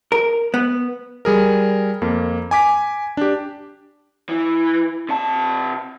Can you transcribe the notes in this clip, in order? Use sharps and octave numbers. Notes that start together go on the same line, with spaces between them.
A#4
B3
G3 G#4 A#4
F2 A#3
G#5 D6 B6
D4 G4
E3
C3 A5